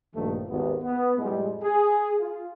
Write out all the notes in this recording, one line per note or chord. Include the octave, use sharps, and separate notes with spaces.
A#1 G2 A#2 D#3 F3 A3
G#1 D#2 B3
B3
F2 A2 G3 G#3
G#4
F4